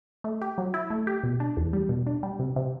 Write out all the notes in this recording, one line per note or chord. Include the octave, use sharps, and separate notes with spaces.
A3
G4
F#3
E4
A3
G4
B2
D4
E2
G3
B2
D4
G3
C3
C3